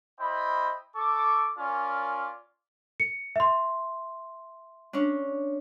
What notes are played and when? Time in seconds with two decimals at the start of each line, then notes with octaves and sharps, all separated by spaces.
0.19 E4 C5 D#5 G5 B5
0.96 A4 C#6 D6
1.58 C#4 F4 A#4 D5
3.00 C#7
3.36 E5 C6
4.93 C#4 D4